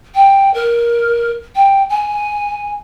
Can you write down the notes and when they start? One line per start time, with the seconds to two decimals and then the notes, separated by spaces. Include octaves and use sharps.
0.15 G5
0.54 A#4
1.55 G5
1.90 G#5